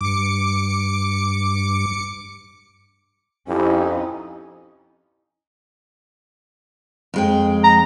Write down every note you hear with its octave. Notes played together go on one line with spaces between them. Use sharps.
G2 D6 C#7
F2 C#4 D#4 E4 G4
F2 G#3 G5
A#5